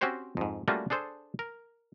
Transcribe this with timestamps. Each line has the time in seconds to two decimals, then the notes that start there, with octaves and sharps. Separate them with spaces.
0.01 C4 C#4 F#4 G4 C5 C#5
0.37 F2 G#2
0.68 G3 A3 A#3 C#4 F4 F#4
0.90 D4 G#4 A4 C5
1.39 A#4